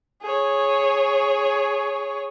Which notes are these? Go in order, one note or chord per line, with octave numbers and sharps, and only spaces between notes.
G#4 C#5